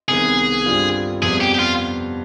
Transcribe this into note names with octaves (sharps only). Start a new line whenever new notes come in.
C2 C3 D#3 B3 G#4
G2 D3 G3 C4 F4
F2 C3 G3 B3 G#4
G4
G4
F4